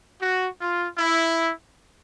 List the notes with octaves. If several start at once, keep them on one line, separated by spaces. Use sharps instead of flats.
F#4
F4
E4